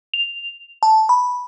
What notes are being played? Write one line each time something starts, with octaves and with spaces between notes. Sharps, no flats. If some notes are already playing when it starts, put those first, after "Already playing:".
F7
A5
B5